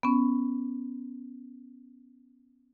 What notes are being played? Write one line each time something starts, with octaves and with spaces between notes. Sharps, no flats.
B3 C#4